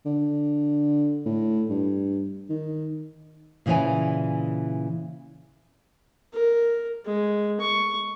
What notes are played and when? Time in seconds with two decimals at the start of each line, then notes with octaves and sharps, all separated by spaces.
0.06 D3
1.26 A2
1.70 G2
2.50 D#3
3.66 A#2 C#3 E3 E4 C#5 G#5
6.33 A#4
7.05 G#3
7.61 C#6